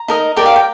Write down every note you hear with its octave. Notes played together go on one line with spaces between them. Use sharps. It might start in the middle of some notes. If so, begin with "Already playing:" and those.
Already playing: A#5
D#4 A#4 D#5
G4 A#4 D5 G5
F5
G5